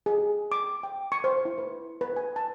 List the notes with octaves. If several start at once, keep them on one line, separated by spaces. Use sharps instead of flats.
G#4
D6
G5
C#6
C5
E4
B4
B4
G#5
A5